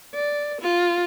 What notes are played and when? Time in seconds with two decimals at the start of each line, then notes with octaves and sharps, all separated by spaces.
0.14 D5
0.61 F4